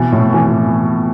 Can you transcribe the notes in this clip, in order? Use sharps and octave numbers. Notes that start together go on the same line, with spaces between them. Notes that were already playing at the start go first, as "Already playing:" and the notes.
Already playing: B2 E3
A2
E3